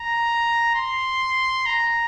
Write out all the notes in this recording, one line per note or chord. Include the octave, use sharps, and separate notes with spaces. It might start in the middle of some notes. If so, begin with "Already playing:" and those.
Already playing: A#5
C6
A#5